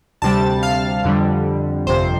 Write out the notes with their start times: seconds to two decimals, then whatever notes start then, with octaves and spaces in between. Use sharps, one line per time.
0.22 D2 C3 G3 A5
0.63 F5
1.04 F2 D3 G3
1.87 G1 F2 C3 C5